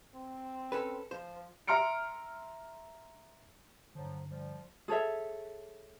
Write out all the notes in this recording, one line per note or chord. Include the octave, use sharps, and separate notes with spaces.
C4
C#4 A4 B4
F3 C5
E5 A#5 C6 F6 C#7 D7
G2 D3 F3 F#3
F3 G3
G#4 A4 C#5 E5